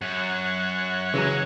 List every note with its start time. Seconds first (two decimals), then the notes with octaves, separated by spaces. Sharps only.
0.02 F#2 C#5 F#5
1.14 C#3 E3 F#3 G#3